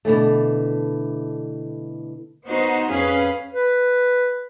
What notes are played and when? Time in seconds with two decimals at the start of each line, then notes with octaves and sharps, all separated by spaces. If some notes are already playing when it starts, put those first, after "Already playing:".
0.05 B2 D3 E3 A3
2.47 B3 D#4 F#4 C5
2.89 F2 C#4 G#4 B4 F5
3.53 B4